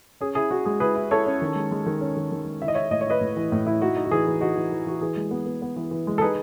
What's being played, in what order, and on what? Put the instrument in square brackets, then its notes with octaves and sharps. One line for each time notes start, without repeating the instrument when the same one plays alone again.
[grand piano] C#4 G#4
E4 G#4
E4 F#4
G#3 G#4
E4 G#4 B4
E4
E4 A4 C#5
C#4
D#3
G#3
G#3
D#3
C#4
D#3
D#3
G#3
E4 E5
D#5
E4 C#5 E5
A2 D#5
C#5
E4 B4 D#5
A2
E3
A2
E4
D#4 F#4
D#4
F#4
E3 G#4
E3
D#4 F#4
E3
E3
E3 F#4
E3 G#4
G#3
B3
B3
B3
E3
E3
G#3
A4
D#4 G#4 B4